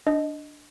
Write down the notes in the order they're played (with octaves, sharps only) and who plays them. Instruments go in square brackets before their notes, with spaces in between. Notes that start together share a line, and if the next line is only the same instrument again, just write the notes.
[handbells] D4 D#5